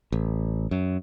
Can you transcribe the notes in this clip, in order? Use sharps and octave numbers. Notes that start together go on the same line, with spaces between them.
A1
F#2